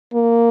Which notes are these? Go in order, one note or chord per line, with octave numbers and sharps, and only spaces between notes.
A#3